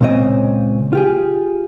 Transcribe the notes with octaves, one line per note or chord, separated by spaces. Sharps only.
C#2 A#2 C#3 C4 D#5
F4 G4 G#4